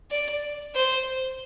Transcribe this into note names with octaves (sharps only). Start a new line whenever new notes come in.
D5
C5